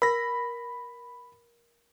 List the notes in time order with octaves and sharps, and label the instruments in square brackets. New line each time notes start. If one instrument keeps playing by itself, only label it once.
[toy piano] A#4 [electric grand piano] B5 A#6